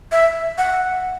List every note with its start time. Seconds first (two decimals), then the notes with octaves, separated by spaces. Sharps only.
0.12 E5
0.58 F#5